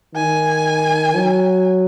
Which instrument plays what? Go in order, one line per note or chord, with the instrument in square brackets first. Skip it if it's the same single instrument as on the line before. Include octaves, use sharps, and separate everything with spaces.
[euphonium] D#3 [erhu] G#5
[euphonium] F#3